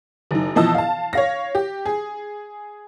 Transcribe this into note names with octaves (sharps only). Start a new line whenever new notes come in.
F#1 D#4
B2 E3 F3 D#5 A5 E6
F5 A5
C#5 F5 A#6
G4
G#4